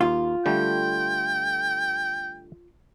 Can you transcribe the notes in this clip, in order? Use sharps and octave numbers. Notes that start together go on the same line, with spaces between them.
D#2 F4
D3 G3 A3 G5